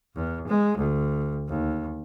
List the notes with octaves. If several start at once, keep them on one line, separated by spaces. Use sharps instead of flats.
E2
G#3
D2
D#2